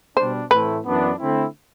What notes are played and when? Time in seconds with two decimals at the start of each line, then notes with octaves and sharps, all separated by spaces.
0.17 B2 G3 D4 C5
0.51 A2 E3 A3 C4 E4 B4
0.85 F#2 E3 B3 D4
1.19 D3 A3 C4 E4